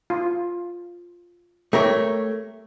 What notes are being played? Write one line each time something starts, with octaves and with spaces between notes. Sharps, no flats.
F4
A3 G4 A#4 C#5